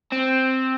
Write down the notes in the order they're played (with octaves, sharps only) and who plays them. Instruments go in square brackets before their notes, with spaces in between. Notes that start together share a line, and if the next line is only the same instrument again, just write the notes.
[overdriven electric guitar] C4